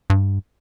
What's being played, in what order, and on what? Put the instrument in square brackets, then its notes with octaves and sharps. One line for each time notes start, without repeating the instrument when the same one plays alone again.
[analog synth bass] G2